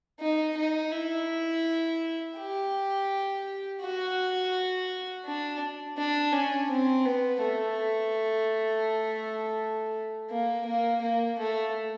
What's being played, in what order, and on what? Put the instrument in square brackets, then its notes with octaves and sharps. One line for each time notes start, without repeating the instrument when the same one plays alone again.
[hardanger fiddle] D#4
D#4
E4
G4
F#4
D4
D4
C#4
C4
B3
A3
A#3
A#3
A#3
A3